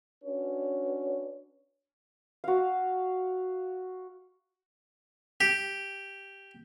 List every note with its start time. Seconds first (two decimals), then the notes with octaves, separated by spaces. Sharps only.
0.24 C#4 D4 F#4 B4 C#5
2.44 F#4 F5
5.41 G4